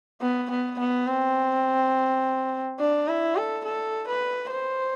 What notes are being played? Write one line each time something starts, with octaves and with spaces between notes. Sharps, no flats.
B3
B3
B3
C4
D4
E4
A4
A4
B4
C5